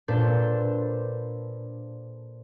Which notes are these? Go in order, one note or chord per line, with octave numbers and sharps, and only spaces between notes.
A#2 D4 A4 B4 C5 G6